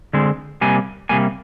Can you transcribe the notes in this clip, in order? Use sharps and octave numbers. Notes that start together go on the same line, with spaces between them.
D3 G#3 C4
C3 G3 A#3 G#5
C3 G3 A#3 G#5